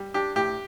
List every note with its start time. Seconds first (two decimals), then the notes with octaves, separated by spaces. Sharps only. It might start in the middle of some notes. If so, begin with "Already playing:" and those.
Already playing: G3
0.14 D4 G4
0.36 A2 G4